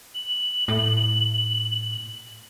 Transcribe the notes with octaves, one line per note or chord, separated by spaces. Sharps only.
F#7
A2